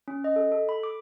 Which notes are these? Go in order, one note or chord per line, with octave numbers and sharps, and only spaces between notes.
C#4
D#5
A4
A4
B5
D6